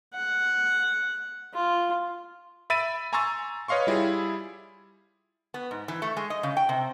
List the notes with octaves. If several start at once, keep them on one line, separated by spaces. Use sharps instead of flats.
F#5
F4
E5 B5 A6 D7 D#7
G#5 A#5 C6 C#6 E6 A6
B4 C#5 D#5 F5 C6 C#6
G3 E4 F4 G#4
B3
G#2
E3
A3
G#3
D#5
C#3
G5
C3